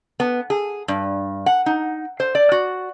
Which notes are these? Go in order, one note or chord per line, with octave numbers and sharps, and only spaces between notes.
B3
G#4
G2
F#5
D#4
C5
D5
F#4